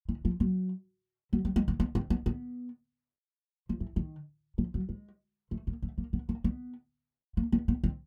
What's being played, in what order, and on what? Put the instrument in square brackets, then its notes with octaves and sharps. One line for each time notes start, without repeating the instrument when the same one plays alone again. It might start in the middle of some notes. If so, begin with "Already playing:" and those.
[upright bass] E3
F3
F#3
F#3
G3
G#3
A#3
B3
C4
B3
B3
F3
E3
D#3
F3
F#3
G#3
A3
A#3
A3
A#3
B3
A#3
B3
A#3
B3
B3
C4